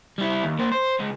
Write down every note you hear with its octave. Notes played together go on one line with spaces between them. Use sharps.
G3 E4
D#2
A#3 C5
C5
C#2 G#3